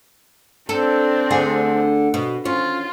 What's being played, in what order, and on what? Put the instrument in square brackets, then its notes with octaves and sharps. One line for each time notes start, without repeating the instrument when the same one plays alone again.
[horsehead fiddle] C4 D4 [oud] A4
[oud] D2 D3 G#4
B2
[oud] C#4 [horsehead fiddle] F4